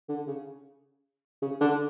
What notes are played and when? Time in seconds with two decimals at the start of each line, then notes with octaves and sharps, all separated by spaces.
0.09 D3
0.27 C#3
1.42 C#3
1.60 D3